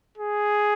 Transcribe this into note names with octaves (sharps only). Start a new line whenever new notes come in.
G#4